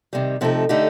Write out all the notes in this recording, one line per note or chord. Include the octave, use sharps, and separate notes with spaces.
C3 D#3 G3
C3 F3 A3 D#4 A4
D3 A3 D#4 G4